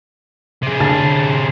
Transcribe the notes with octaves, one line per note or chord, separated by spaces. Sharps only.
C3 G#4
D3 A5 A6